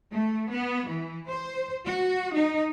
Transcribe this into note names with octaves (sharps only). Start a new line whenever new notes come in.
A3
B3
E3
C5
F#4
D#4